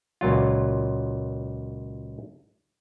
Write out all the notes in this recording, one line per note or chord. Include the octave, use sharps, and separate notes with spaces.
C#2 A#2 F#3 F4